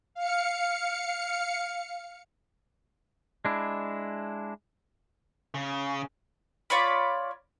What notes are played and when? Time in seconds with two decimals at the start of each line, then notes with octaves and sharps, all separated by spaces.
0.14 F5 C#7
3.45 G#3 D4 E4
5.54 C#3
6.70 F4 C#5 D5 B5